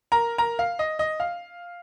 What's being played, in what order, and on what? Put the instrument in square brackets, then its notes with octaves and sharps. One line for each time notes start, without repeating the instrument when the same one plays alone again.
[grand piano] A#4 A#5
A#4 A#5
F5
D#5
D#5
F5